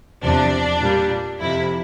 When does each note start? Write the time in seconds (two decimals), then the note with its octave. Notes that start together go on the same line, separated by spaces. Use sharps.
0.23 E2 C3 F3 D4
0.81 A#2 G3
1.40 F2 C3 F3 E4